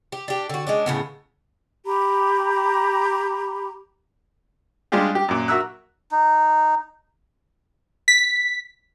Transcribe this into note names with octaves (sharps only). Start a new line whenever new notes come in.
G4
D4 G4
D3 F#4
G#3 C#4 D4
A2 C#3 B3
G4 A#5 B5
G3 G#3 D4 F4 G4 G#4
G4
F#2 A#2
F#4 A#4 E5 A#5 E6 F#6
D#4
B6